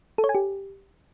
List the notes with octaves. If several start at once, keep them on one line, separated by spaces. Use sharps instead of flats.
A4
C#5
G#5
G4